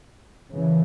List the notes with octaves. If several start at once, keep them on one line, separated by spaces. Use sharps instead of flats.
C#3 E3